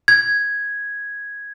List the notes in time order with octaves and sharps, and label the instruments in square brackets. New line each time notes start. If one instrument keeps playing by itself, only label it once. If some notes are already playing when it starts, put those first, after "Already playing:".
[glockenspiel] G#6